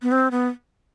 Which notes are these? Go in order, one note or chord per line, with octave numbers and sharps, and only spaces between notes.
B3
C4
B3